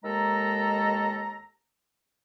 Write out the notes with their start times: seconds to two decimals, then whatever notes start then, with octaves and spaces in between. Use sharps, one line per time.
0.04 D#2 D#3 G#3 A4 A#5